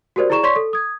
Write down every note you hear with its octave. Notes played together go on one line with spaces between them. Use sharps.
F#4 G4 A#4 C5 D5
E4 G#4 D5 A#5 C#6 E7
C#5 D5 C6 C#6 B6
A4
D#6 G#6